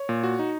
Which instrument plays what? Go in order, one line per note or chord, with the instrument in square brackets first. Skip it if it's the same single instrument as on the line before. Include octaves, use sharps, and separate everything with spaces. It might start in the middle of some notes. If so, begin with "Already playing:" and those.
Already playing: [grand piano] C#5
[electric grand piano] A#2
F#4
D#4